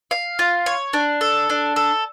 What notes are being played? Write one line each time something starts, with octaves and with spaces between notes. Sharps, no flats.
F5
F4
C#5
D4
A4
D4
A4